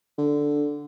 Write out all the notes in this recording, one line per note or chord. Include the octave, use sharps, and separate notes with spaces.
D3